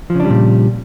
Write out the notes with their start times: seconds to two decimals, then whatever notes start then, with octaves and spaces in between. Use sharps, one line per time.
0.10 F3
0.15 C#3
0.20 D4
0.25 G3
0.30 A#2